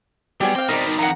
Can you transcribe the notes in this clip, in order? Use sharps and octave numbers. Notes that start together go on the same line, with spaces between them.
F#3 G3 B3 G4 G#4
C4 F5 G5 D6
B2 D#3 G3 C4 D#4 A#4 D5
D#3
F2 F#5 A#5